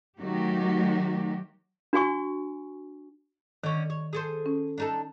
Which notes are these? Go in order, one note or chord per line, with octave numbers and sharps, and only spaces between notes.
D#3 F#3 A3 F#4 G4
D4 F#4 G#5 C#6
D3 D#3 C#4
C#5
G#4 A4 C5
C#4
D4 D#4 A4